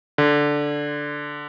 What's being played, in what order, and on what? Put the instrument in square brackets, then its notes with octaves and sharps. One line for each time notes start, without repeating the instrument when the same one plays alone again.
[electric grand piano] D3